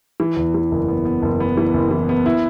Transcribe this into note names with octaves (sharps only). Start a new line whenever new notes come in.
E3
E2
E3
F#1
B3
B3
F#1
B3
E3
F#1
E3
B3
E4